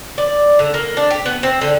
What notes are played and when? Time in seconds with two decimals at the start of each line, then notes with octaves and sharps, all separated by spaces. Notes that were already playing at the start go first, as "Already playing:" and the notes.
0.18 D5
0.59 D3
0.74 A#3
0.97 D4
1.11 G4
1.25 B3
1.43 C4
1.61 D3